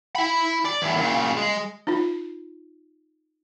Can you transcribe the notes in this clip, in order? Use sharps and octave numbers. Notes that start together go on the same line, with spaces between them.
E4 B5
D5
E2 A2
A#2 C#3
G#3
D#4 F4